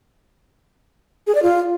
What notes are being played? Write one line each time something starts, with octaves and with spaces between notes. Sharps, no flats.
G#4
D5
F4